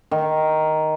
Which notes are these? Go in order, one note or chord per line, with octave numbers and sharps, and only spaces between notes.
D#3